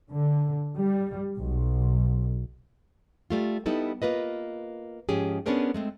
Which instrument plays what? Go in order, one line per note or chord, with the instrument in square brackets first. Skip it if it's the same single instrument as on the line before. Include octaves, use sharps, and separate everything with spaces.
[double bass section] D3
G3
B1
[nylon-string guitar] G3 A3 F4
G3 B3 D#4 E4 A4
A#3 F4 B4 D#5
G#2 F3 C#4 G4 G#4
B3 C#4 D4 G#4 A#4 C5
G#3 A3 C4